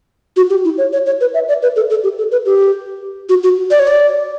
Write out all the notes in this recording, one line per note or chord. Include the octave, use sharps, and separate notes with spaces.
F#4
G4
E4
C#5
C#5
C#5
B4
E5
D5
B4
A4
A4
G4
A4
B4
G4
F#4
F#4
D5
C#5
D5